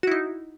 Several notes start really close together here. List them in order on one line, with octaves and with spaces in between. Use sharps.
F#4 E4 D#4